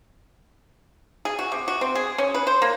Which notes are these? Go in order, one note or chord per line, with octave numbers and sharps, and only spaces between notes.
G#4
F#4
C3
F#4
C4
G#4
C#4
B4
C5
A#3